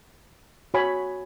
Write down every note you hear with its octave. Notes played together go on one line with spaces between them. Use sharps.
F#4 C#5 G#5 B5